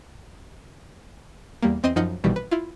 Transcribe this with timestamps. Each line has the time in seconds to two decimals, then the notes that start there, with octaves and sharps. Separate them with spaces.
1.62 E2 G3 A#3
1.83 E2 C4 D#5 C6 D#7
1.96 F#2 F3 D#4 F#5 F6 G6
2.24 A#1 B2 D#3 E3 G3
2.36 B4
2.51 E4 F4